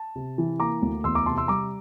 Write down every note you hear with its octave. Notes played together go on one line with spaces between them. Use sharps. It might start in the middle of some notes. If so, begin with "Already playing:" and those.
Already playing: A5
C3
E3
A#3 A#5 D6
D2
E2 C6 E6
A#5 D6
C3 A5 C6
C6 E6
G3 A#5 D6